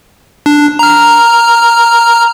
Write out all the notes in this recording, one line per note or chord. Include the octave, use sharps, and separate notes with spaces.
D4
A#5 F6